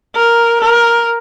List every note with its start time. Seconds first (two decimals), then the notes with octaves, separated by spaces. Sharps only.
0.16 A#4
0.62 A#4